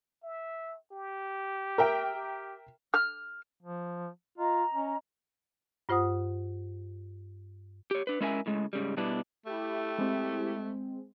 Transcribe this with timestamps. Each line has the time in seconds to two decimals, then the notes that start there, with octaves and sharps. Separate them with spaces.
0.23 E5
0.92 G4
1.78 A#4 E5 G5
2.15 G4
2.94 F6
3.62 F3
4.38 F4 D#5 A#5
4.74 C#4
5.89 G2 F4 C5 F#5 D#6
7.91 G4 C#5
8.07 D4 B4
8.20 G#3 C#4 E4 A#4 E5 G#5
8.46 A2 C#3 G#3
8.73 G#2 C#3 G3
8.97 B2 G3 B3 D4 E4
9.46 A3 E4 G4
9.98 G#3 C4